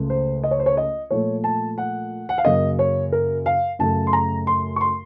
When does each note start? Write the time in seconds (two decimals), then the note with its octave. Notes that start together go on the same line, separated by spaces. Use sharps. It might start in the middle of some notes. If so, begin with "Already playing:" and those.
Already playing: C#2 C#3 A3
0.10 C5
0.44 D#5
0.51 C#5
0.59 C5
0.66 C#5
0.77 D#5
1.11 A#2 F3 A3 C#5
1.44 A5
1.78 F#5
2.29 F#5
2.38 F5
2.45 F#2 C#3 F#3 A#3 D#5
2.79 C#5
3.12 A#4
3.46 F5
3.79 F#2 C#3 A3 A5
4.07 C6
4.13 A#5
4.47 C6
4.76 C#6
4.81 C6